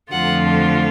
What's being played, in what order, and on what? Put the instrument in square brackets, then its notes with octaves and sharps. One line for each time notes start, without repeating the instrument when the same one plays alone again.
[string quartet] F2 D3 F3 A3 F4 F#5